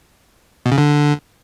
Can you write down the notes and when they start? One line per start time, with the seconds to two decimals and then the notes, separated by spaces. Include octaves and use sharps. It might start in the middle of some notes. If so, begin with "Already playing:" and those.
0.66 B2
0.72 C#3
0.78 D3